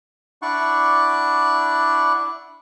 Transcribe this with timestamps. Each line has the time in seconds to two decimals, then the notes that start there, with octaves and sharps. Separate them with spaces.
0.42 D4 E4 D5 F#5 C#6